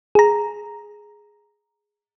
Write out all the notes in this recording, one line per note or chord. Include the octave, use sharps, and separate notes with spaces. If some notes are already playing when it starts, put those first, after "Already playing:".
G#4 A#5